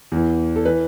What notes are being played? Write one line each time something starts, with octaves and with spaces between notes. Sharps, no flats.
E2 E3
A4
E3 B4